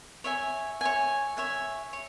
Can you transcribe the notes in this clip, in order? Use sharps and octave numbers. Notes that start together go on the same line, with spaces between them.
C#5 E5 G#5
C#5 E5 G#5
C#5 E5 G#5
C#5